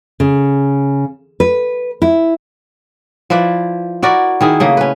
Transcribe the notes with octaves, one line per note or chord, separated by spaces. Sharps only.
C#3
B4
E4
F3 E4 B4 D5
E4 F#4 A#4 D5
D#3 E4 G#4
C#3 A3 A#3
C#4 B4